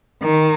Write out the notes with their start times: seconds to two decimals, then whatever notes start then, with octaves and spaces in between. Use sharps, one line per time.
0.22 D#3